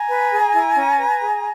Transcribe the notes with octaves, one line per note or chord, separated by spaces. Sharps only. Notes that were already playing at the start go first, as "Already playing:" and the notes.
Already playing: G#5 A#5
B4
G#4
E4
C#4
B4
G#4